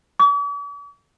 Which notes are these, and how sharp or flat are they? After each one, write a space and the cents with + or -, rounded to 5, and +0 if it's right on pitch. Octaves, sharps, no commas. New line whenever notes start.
D6 -45